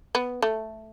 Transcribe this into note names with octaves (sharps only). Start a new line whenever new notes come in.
B3
A3